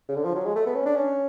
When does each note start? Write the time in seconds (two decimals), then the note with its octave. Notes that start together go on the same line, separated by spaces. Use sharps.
0.09 C#3
0.16 D3
0.25 F3
0.36 F#3
0.46 G#3
0.56 A3
0.66 B3
0.76 C#4
0.86 D4
0.96 C#4